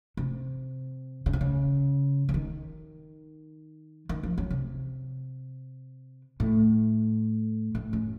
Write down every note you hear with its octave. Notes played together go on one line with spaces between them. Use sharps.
C3
C#3
C3
C#3
C#3
D#3
D#3
F3
F#3
C3
A2
A2
F#2